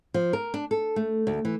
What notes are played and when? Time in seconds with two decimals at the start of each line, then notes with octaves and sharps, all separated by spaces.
0.14 F3
0.33 A#4
0.54 D4
0.71 A4
0.96 A3
1.27 D2
1.45 E3